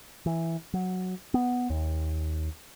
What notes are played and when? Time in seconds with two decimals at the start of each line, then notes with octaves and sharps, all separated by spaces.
0.26 E3
0.74 F#3
1.34 B3
1.70 D#2